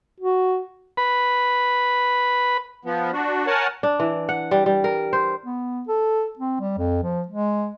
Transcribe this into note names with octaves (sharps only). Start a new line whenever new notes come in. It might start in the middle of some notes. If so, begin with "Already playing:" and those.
F#4
B4 B5
F3 B3
D4 F#4
A#4 C#5 F#5 G#5 A5
D4
E3
F#5
G3
G3
A#4
C5
B3
A4
C4
G3
F2
F3
G#3